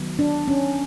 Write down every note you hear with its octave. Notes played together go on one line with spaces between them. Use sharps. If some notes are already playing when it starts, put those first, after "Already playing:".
Already playing: D#3 F#3 B3
D4
C#4